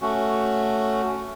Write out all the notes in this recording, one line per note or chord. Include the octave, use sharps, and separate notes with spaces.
A3 C#4 F#4